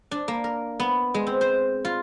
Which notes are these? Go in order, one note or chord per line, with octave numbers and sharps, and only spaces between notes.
D4
A#3
A#4
B3
G#3
C4
C5
F4